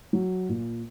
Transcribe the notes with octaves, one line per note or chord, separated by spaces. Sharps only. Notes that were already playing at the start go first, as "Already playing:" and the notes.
F#3
A#2